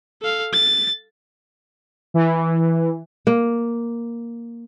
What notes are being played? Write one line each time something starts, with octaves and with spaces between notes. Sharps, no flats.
A4 F5
A6
E3
A#3